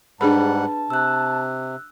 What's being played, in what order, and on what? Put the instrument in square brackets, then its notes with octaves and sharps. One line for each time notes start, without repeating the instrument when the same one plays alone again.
[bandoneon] G#2 G3 F#5 [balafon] D4 G#4 B5 [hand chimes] B4 [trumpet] A5
[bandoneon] C3 [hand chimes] E6 F#6